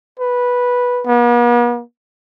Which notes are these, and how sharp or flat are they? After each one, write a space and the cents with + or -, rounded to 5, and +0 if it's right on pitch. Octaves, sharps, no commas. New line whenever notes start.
B4 -10
B3 -45